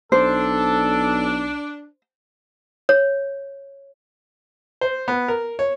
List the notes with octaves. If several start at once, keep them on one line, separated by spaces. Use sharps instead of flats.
B1 D4 A4 C5
C#5
C5
B3
A#4
C#5